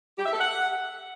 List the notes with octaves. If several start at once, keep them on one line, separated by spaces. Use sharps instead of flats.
G4
E5
A4
F#5